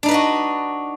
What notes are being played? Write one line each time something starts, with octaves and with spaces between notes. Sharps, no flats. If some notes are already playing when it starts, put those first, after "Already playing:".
D4 D#4 F#4 B4 D#5